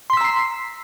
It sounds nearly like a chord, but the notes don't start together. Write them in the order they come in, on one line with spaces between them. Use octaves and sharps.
C6 B6 E6 A#5 C7